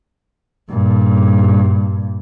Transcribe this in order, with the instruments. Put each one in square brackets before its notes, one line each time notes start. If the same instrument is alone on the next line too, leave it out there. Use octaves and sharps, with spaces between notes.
[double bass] G2 A#2